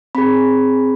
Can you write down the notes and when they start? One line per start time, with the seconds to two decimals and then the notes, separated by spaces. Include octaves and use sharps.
0.15 C4 G#4 B5